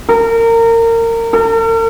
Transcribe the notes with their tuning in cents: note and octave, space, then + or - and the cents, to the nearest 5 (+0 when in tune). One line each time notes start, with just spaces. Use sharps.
A#4 -25
A#4 -45